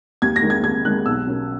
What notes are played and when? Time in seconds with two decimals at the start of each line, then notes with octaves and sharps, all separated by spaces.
0.22 D#2 G#6
0.36 A#6
0.42 D#3 G#3
0.50 G#6
0.63 D#2 G#6
0.85 D#3 G#3 F#6
1.06 B1 E6
1.27 B2 A#3 C#4